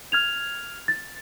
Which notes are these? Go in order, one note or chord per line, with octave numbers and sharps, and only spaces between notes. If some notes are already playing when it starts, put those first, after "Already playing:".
F6 G#6 F7
A6